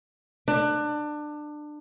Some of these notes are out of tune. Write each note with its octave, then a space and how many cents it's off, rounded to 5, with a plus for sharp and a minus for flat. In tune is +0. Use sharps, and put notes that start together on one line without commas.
D4 +25